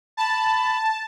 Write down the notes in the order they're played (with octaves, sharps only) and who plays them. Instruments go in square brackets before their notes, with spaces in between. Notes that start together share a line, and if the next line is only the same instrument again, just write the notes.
[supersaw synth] A5 [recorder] B5